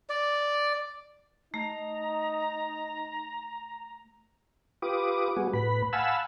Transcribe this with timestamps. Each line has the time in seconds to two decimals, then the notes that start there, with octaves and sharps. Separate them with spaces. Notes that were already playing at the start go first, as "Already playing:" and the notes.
0.09 D5
1.54 A3 D#4 A#5
4.82 F4 G4 B4 D6 D#6
5.37 G3 B3 F#4 G#4
5.53 A2 B4 B5
5.93 F5 F#5 G#5 A5 B5 E6